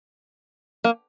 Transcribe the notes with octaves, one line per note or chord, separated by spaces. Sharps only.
A#3